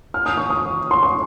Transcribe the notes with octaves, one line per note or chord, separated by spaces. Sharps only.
F6
D#6
C#6
D#6
C6
C#6